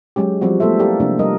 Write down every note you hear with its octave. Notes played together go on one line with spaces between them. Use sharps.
F#3 G#3 C#4 G4
F3 G3 C4 F#4
A3 B3 A4 C5 E5
E4 F4 G4 A4 A#4 D5
C3 F3 A#3 D4
G3 A#4 D#5